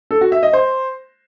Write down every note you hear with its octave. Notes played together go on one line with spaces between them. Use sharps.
A4
F#4
E5
D#5
C5